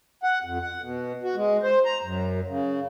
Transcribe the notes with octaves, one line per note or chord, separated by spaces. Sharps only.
F#5
F2
F#5
B2
F#4
G#3
C5
A#5
F#2
C#3